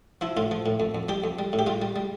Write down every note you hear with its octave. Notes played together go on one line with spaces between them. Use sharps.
F3 E4
A2 F4
F3
A2
F2
F2
G3 G4
F2
G3
A2
G4
G3 F4
G3
G3